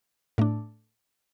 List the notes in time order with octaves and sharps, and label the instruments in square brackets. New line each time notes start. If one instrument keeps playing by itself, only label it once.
[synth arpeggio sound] A2 A3 D4